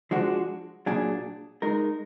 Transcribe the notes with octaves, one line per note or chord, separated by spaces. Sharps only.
F3 G#3 D4 F#4
A#2 F#3 D4 G#4
G#3 D#4 A#4